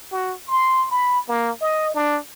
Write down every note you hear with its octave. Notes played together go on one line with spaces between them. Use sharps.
F#4
C6
B5
A#3
D#5
D4